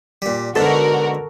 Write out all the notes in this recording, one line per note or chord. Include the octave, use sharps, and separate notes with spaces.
A#2 G3
G#2 B2 D3 F#4 A4 A#4